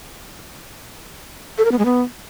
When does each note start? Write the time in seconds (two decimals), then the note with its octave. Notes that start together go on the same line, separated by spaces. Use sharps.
1.58 A4
1.65 A#4
1.72 B3
1.78 G#3
1.85 B3